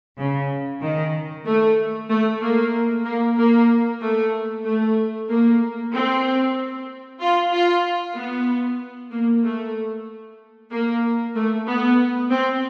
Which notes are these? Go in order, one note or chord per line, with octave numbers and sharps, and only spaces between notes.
C#3
D#3
A3
A3
A#3
A#3
A#3
A3
A3
A#3
C4
F4
F4
B3
A#3
A3
A#3
A3
B3
C4